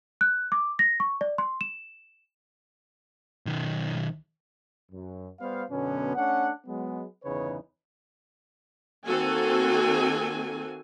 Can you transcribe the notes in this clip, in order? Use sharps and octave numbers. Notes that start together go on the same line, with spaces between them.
F#6
D6
A#6
C#6
D5
C6
E7
B1 D#3
F#2
G3 B3 C5 F5
F#2 B2 D3 B3 C#4
A3 C#4 D4 F#5
F#3 G#3 B3
G1 E2 C#3 D#4 B4 C#5
D#3 A#3 C4 F#4 A4 G#5